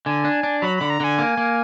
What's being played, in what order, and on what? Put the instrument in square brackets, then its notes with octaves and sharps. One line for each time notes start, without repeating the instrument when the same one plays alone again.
[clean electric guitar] D3 [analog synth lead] G#5
[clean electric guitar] D4
D4
[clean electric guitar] F#3 [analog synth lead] B5
[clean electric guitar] D3 [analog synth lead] B5
[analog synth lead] A#5
[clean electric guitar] D3 [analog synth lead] G#5
[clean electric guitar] A#3
A#3